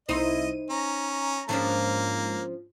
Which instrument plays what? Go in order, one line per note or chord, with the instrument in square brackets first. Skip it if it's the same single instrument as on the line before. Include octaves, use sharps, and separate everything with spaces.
[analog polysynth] C2 E4 D#7 [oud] D#4 C5 [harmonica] D#5
[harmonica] C#4 [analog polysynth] A#5
[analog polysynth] G#2 [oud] F3 C#4 D4 [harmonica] A#3